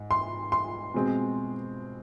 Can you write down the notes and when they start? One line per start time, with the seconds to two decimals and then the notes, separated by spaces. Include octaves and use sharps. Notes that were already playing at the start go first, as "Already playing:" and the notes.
Already playing: G#2
0.11 C6
0.52 C6
0.94 B2 G#3 C4